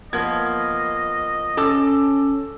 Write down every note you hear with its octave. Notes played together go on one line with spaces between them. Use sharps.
F3 A#3 B3 D#5 G#6
C#4 A4 D6 E6